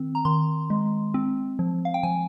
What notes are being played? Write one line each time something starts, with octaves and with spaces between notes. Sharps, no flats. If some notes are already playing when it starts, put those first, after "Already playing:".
Already playing: D#3 C4
A#5
D#3 C6
G#3
C4
F3
F5
G5
F3 G#5